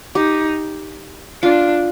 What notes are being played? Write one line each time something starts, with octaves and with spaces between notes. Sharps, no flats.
D#4 G4
D4 F4